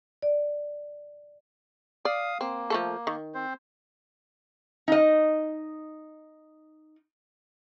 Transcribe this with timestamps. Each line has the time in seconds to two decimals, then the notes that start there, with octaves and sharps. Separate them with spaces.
0.22 D5
2.05 D5 F5 D#6
2.41 A#3 C4
2.70 F3 A3 A4
3.07 D#3
3.34 C4 C5
4.88 D#4 D#5